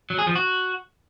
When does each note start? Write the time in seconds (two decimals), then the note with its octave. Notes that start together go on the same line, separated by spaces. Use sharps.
0.10 F#3
0.19 G#4
0.27 F3
0.35 F#4